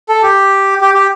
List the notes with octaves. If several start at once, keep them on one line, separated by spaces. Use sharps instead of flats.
A4
G4
G4
G4